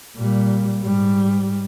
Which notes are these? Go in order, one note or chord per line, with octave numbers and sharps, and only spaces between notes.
A#2 G3
G#2 G3